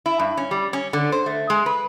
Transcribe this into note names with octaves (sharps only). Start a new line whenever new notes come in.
E4
G2
C#4
G3
C#4
D3
C5
A3
G#3
B4